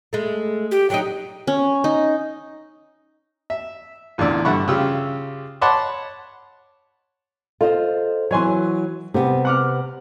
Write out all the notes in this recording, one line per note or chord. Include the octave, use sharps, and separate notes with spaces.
G#3 A3
G4
F#3 C#4 D#4 G5
C#4
D#4
E5
A1 E2 A#2 D3 D5 E6
G2 D3 E5 F#5 B5 C#6
C#3 F4 G4 E6
C#5 F#5 A5 B5 C6 D6
F4 A4 C5 D#5
E3 F#3 C#5 G#5 C6
C3 G3 B3
F#5 D6 F6